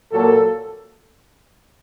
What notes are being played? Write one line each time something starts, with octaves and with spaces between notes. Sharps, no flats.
A#2 F#3 A#3 A4